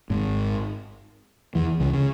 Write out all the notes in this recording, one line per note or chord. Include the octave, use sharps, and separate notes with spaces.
G#1 G#2
E2 E3
C#2 C#3
C#3